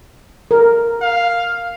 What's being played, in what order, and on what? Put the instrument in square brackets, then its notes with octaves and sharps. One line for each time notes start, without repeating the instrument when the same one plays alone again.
[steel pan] A#4
[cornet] F5